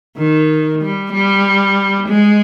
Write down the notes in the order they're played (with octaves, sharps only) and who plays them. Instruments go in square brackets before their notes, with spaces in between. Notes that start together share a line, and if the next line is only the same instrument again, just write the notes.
[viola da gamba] D#3
G3
G3
G#3